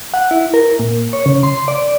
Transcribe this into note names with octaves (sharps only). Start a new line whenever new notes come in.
F#5
E4
A#4
A#2
C#5
C#3
C6
D5